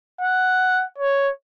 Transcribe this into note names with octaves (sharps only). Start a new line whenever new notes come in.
F#5
C#5